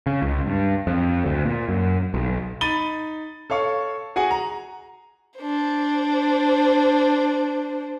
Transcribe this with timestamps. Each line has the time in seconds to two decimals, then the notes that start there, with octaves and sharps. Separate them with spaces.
0.07 C#3
0.22 C#2
0.47 G2
0.87 F2
1.25 D2
1.45 A#2
1.69 F#2
2.14 B1
2.61 D#4 B5 A6 D#7 G7
3.50 A4 C#5 F5 C#6
4.16 F#4 G#4 F#5 G#5
4.31 A#5
5.39 D4 C5